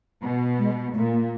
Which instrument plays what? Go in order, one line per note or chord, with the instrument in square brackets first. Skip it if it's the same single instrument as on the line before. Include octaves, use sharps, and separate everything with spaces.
[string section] B2
[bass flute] G#3
[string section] A#2 [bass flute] A3
[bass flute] A#3